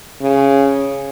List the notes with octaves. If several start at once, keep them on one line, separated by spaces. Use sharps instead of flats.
C#3